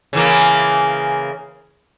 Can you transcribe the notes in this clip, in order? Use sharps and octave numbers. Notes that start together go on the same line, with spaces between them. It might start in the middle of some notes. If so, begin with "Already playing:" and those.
C#3 E3 A#3